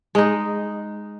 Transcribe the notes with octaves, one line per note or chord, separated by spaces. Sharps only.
G#3 D#4